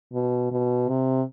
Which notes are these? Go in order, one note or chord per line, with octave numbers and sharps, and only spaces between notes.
B2
B2
C3